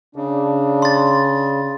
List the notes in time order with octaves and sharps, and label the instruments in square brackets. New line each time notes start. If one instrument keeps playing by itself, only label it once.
[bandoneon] C#3 [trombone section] D4
[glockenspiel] C6 A6